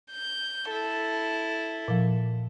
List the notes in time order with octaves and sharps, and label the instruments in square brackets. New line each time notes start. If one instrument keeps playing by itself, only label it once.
[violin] G6
E4 A4
[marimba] A#2 F3